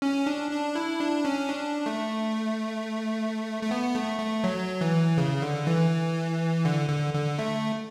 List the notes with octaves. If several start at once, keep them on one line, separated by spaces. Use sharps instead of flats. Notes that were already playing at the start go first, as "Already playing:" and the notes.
C#4
D4
D4
E4
D4
C#4
D4
A3
A3
B3
A3
A3
F#3
E3
C#3
D3
E3
D3
D3
D3
A3